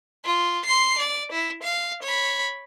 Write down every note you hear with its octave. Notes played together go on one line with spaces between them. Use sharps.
F4
C6 C7
D5
E4
F5
C#5 B5